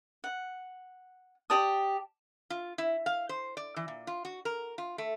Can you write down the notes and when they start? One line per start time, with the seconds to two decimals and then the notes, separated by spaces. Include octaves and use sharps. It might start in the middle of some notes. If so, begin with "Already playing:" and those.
0.24 F#5
1.50 G4 D5 A5 D#6
2.50 F4
2.78 E4
3.06 F5
3.29 C5
3.57 D5
3.76 E3
3.88 A#2
4.07 F4
4.25 F#4
4.45 A#4
4.78 F4
4.98 A3